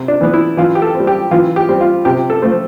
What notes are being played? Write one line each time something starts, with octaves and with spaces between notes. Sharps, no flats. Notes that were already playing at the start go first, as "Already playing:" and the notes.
Already playing: C3
D4
E3 B3
E4
E3 F4
G4
A4
C4
G3
G4
E3 F4
G4
G3 C4
F4
C3 G4
A4
F3 A3 C4